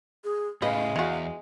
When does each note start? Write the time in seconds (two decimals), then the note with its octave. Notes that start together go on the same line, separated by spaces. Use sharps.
0.24 G#4
0.62 A2 C#3 G#3 B4 D#5 F5
0.96 E2 E3 F#4